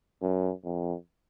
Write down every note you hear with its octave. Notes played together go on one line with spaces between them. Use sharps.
F#2
F2